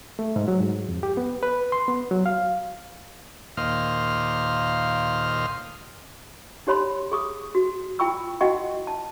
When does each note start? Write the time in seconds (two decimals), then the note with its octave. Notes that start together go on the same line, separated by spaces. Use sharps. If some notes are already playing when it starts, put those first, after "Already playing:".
0.19 A3
0.36 G#2
0.48 F#3
0.60 G#2
0.89 F2
1.03 G4
1.17 B3
1.43 B4
1.72 C6
1.88 B3
2.11 F#3
2.26 F5
3.57 D#2 A#2 C5 D#5 F5 F6
6.67 D#4 G4 C#5 B5 C6
7.12 G#4 C#6 D#6
7.55 F#4
7.99 E4 F4 G5 B5 C#6 E6
8.41 E4 F#4 D#5 F#5 G5 C#6
8.87 A5